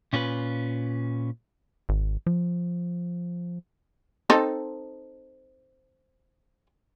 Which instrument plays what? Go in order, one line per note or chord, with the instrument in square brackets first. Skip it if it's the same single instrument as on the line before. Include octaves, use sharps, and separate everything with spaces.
[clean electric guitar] A#2 C#4 F4 F#4 B4
[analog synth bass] G#1
F3
[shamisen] C4 D#4 A4